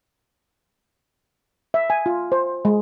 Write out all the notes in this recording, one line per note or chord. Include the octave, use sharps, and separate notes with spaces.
E5
G#5
F4
C5
G#3